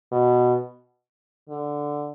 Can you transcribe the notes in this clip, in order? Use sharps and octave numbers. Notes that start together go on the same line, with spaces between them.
B2
D3